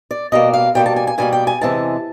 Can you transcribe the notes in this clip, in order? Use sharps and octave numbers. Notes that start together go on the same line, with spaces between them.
D5
B2 G3 A#3 D#5
F5
B2 G3 A#3 G5
A5
G#5
G#5
B2 G3 A#3 G#5
G5
G#5
E2 C3 E3 G#3 A5